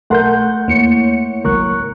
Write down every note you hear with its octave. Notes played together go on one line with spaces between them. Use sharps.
B1 A3 A#4 F#5 C6 G6
E2 A#3 E4 C#5 C#7
G#1 C#2 F#3 A#4 C#6 F#6